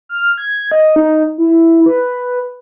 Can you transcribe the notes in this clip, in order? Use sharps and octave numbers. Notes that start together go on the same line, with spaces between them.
F6
G#6
D#5
D#4
E4
B4